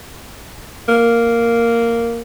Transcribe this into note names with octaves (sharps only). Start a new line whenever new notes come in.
A#3